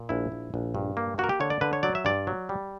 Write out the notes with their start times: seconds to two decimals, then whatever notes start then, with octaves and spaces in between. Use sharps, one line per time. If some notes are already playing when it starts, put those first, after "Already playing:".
Already playing: A#2
0.09 A#1 E4
0.32 A#1
0.54 A#1
0.75 G2
0.97 A#3
1.18 A#3 F#4
1.24 A#4
1.29 G4
1.40 D3 C#5
1.50 D5
1.61 D3 B4
1.73 C#5
1.83 F#3 D5
1.95 E5
2.05 G2 D5
2.27 F#3
2.49 G3